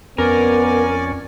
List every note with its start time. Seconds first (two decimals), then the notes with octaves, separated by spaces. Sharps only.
0.18 F2 B3 C#4 A#4 D5 G#5